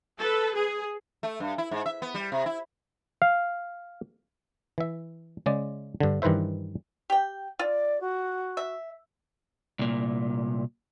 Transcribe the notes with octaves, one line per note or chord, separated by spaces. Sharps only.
A4 B4
G#4
A3
G2
E4
G#2
E5
B3
G3
C3
E4
F5
E3 E5
C#3 G#3 D5
G2 D3
G2 D#3 E3 B4 C5 E5
G4 G5
F4 D5
F#4
E5
C2 A#2